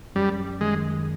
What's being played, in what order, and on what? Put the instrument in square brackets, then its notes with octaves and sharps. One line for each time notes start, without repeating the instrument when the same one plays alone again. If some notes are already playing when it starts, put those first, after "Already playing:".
[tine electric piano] F#2 [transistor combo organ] G3
[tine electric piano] D#3 [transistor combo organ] G#3